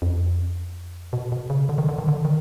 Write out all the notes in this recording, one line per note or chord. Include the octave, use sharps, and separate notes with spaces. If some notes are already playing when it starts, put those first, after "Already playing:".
F2
B2
B2
C#3
D3
D#3
D3
D#3
D3
D#3